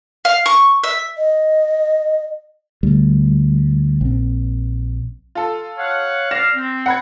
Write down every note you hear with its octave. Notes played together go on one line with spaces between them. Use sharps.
F5
C#6
E5
D#5
D2 G3
A#1 C4
F4 A4
C#5 F5 F#5
D5 F5 A#6 E7
C4
F#5 B5 G#6